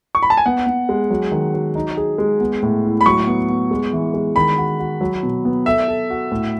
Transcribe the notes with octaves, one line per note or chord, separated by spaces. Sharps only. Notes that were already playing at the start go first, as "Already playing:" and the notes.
C#6
B5
A5
G#5
B3 F#5
B3
G#3
F#3
D#3
F#3
D#4
G#4
G#3
B3
A2
E4
B5
F#3 C#6
B3
B3
G#3
E3
G#3
D#3 B5
F#4
F#4
F#3
B2
B3
A4 E5
A4
F#4
A2